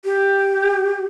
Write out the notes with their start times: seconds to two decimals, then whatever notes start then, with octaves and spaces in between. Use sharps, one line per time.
0.05 G4